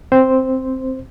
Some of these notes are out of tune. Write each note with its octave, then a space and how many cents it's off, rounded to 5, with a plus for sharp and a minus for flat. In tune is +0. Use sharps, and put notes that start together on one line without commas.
C4 +0 C5 +0